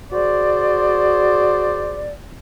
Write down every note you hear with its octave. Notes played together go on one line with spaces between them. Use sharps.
F#4 G#4 C5 D5